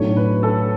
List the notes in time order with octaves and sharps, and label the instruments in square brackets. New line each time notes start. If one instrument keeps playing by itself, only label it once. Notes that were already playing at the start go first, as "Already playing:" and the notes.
Already playing: [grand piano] B1 A2 F#3 A3 D4 [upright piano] C#5
[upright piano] B4
A4